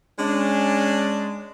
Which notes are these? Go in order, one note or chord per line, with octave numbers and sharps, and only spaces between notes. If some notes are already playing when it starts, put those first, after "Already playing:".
G#3 C#4 D4